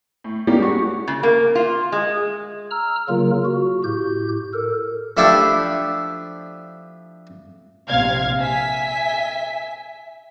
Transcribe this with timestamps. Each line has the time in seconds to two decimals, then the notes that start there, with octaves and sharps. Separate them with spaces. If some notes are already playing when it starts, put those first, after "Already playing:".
0.24 A2
0.47 G3 G#3 A#3 C#4 D#4 G4
0.62 F#4 G#4 C#6
1.08 C#3
1.23 A#3
1.55 F4
1.92 G#3
2.71 A#5 E6 F6
3.09 C#3 F#3 A#3 F4 A#4
3.45 F#4
3.84 A2 G4 G6
4.53 A4 A#4
5.17 F3 A3 D4 E4 G4 A4
7.88 A#1 C3 F5 G#6
8.40 E5 G#5 B6